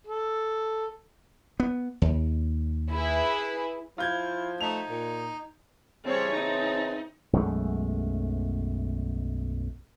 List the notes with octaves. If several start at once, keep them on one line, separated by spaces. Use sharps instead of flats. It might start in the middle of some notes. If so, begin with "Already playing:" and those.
A4
B3
D#2
E4 G#4 B4
F3 E4 F4 G6 G#6
A3 D#4 F7
A#2
C#3 E3 G3 C4 C#5 A5
C4 D#4
B1 F#2 G#3 A3